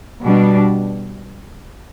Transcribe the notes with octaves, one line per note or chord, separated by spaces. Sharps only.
B2 G3 D4